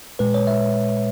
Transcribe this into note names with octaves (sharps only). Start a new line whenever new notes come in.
A#2 G#3 B4
C#5
E5